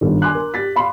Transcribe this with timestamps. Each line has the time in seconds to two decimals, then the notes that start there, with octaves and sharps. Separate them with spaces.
0.01 G1 D#3
0.22 G#5 C6 D6 F#6
0.35 A#4
0.54 G4 A6 B6
0.76 F5 B5 C6